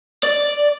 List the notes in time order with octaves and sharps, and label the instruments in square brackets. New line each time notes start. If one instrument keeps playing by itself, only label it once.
[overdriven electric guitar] D5